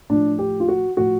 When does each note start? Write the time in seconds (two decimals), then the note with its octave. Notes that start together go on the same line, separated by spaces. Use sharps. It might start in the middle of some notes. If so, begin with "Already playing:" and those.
0.10 A2 F3 D4
0.39 G4
0.60 F4
0.68 F#4
0.97 A2 F3 F#4